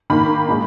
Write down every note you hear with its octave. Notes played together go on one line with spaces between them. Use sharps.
D#3 A#3 B5
A#2 G#3